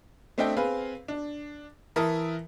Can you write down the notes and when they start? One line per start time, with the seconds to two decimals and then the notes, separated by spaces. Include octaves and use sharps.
0.38 A3 C4 D4 D#5 E5 G5
0.56 C4 G#4 B4 F5
1.08 D4
1.96 E3 A#4 E5 A5 D#6